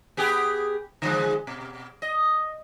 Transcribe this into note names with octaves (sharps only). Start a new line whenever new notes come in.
B3 G4 G#4
D3 F3 G#3
B2
D#5